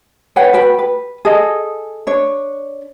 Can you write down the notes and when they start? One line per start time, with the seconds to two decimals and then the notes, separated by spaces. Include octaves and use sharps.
0.36 B4 C#5 F#5 G5
0.53 F#4 B4 G5
0.79 B4
1.25 G#4 A4 D#5
2.07 D4 C#5